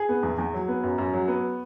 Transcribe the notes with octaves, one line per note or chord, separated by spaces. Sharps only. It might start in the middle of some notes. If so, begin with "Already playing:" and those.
Already playing: G#4
B3
E2
E2
F#3
B3
F#2
F#2
F#3
B3